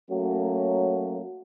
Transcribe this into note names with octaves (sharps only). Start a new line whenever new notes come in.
F#3 A3 A#3 C#4 F#4